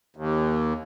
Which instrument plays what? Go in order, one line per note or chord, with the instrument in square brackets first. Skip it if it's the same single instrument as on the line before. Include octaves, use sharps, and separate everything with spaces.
[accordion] D#2